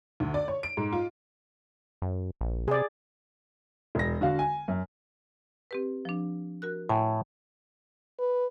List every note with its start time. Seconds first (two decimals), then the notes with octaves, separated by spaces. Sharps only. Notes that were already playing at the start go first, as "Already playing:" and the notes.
0.20 D2
0.34 D5
0.48 C#5
0.63 D7
0.77 G#2
0.93 F4
2.02 F#2
2.41 A#1
2.68 C3 G#4 D5
3.95 E1 A#6
4.21 D3 F#4 F5
4.39 G#5
4.68 F#2
5.71 C4 G4 B4
6.05 F3 D4
6.62 F#4 A#4 F#6
6.89 A2 G#5
8.19 B4